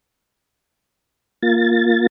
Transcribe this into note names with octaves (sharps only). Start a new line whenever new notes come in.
A#3 F4 A6